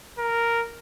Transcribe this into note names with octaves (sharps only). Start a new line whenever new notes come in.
A#4